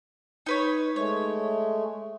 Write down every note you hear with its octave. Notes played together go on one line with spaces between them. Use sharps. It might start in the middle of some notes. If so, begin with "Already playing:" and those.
D#4 B4 C#5
G#3 A3 C#5